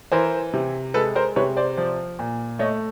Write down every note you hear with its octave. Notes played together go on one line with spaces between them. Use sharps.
E3 A#4 C5
C3
G#3 A4 B4
A#4 C5
C3 B4 C#5
C5 D5
F3
A#2
A3 C#5 D#5